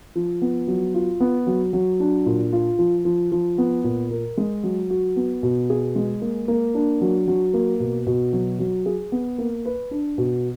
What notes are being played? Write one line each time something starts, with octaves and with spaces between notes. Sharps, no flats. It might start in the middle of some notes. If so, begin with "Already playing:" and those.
F3
B3
F#3
F4
B3
F#3
F#3
D4
A#2
F4
F3
F3
F3
B3
A#2
A#4
G#3
F#3
F#4
B3
B2
G#4
G#3
A#3
A#3
D4
F#3
F#3
A#3
B2
B2
F#3
F#3
G#4
B3
A#3
B4
D4
B2